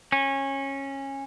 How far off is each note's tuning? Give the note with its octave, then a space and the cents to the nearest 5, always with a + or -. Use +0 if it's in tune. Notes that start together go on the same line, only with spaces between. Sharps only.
C#4 -20